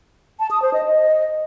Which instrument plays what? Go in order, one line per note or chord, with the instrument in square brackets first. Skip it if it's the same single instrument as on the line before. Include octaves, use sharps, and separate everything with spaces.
[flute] A5
D#6
C5
D#5
D#5